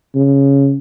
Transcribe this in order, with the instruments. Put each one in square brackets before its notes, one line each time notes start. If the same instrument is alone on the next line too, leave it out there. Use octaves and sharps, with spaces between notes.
[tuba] C#3